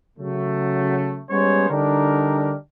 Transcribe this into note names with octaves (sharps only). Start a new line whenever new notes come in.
C#3 F#3 A3
G3 G#3 B3 C#4 C5 C#5
D3 G3 D4 D#4 G4 A#4